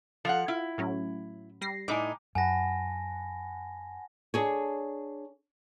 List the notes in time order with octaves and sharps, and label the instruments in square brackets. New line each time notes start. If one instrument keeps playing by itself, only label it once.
[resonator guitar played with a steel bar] F3 F5 F#5 [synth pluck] A4
[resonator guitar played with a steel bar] E4 [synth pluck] F4
[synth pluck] A2 F#3 C#4
G3 A#6 C7
[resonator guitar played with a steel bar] A2 D#4 G#5 [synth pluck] D6
[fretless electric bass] F#2 [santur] F#5 B5 [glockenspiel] G#5 A5 A#6
[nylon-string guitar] D4 G#4 C#5